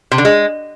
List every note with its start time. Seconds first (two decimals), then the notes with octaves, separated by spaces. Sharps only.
0.12 C3
0.18 D3
0.25 G#3